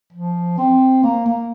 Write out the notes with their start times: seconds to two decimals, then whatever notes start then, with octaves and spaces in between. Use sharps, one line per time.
0.13 F3
0.58 C4
1.04 A#3
1.26 A#3